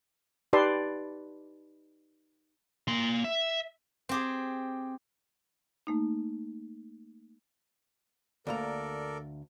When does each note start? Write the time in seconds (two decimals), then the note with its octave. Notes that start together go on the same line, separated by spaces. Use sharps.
0.53 D#4 G4 B4 D5 A5 C6
2.88 A#3 C6
3.24 E5
4.09 C4 G4 G#4
5.87 A3 A#3 D#4
8.47 D2 A#3 A4 A#4 D5 A#5